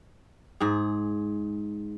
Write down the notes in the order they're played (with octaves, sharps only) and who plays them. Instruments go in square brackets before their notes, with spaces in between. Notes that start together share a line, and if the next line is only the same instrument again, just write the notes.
[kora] G#2 G#4